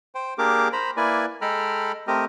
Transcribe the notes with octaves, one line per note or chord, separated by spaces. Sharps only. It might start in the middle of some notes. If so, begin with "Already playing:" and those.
C5 G5
A#3 D4 G4 G#4 A#4 D6
C5 A#5 B5
A#3 E4 B4 D5 G#5
G#3 A4 G5 A#5 B5 F6
A3 C4 G4 A#4 D#5